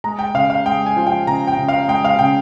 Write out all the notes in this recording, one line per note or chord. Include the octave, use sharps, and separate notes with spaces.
G#3 A#5
G5
C#3 F5
F5
G#3 G5
G#5
F3
G5
C#3 A#5
G5
C#3
F5
G#3 G5
F5
C#3 G5